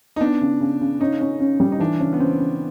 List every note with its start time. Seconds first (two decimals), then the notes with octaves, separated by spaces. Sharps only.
0.16 D#4
0.21 B3 D4
0.41 C#3
0.60 C#3
0.81 C#3
1.00 C#4 D#4
1.20 C#4
1.40 C#4
1.60 G3
1.72 D#4
1.80 E3 D4
2.00 C#3 C#4
2.13 B3
2.20 C#3 C4
2.40 C#3